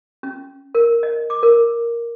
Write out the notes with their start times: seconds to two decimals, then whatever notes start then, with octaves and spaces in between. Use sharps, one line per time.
0.23 C#4
0.75 A#4
1.03 D#5
1.30 D6
1.43 A#4